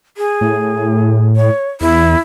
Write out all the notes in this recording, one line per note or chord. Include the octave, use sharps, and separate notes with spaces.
G#4
A2
C#5
E2 E4